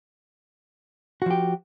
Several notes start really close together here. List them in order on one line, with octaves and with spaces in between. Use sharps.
F#4 F3 G4